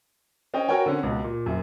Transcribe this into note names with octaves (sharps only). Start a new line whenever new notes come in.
C#4 C5 D#5 G5
F#4 A#4 B4 C#5 G5 G#5
D3 C4 C#4
C#2 B2
A#2
F#1 F#2